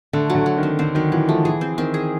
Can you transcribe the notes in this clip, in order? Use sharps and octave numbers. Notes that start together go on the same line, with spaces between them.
D3 A3
F#3
D3
F#3
D#3
C4
D3 C4
D#3 F#3
E3 F#3
F3 A3
E3 G#4
C4
D#3 C4
G#4